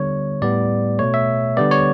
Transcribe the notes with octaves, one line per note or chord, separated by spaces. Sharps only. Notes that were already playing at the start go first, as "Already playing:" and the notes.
Already playing: D3 G3 B3 C#5
A2 G3 B3 D5
B2 A3 C#5
E5
D3 G3 B3 D5
C#5